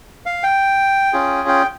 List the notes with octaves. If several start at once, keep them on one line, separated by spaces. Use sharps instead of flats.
F5
G5
C#4 F4 G#4
G5